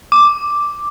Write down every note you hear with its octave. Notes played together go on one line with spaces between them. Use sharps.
D6